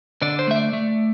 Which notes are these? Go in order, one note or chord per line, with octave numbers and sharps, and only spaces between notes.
D3 D5
C5
A3 E5
D5
A3